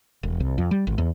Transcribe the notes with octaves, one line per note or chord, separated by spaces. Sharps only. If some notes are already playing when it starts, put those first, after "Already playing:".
E1
C2
F2
G3
G#1
E2